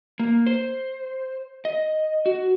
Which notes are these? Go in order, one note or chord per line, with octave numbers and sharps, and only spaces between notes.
A#3
C5
D#5
F#4